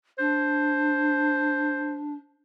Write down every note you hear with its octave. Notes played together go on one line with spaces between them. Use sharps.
D4 C5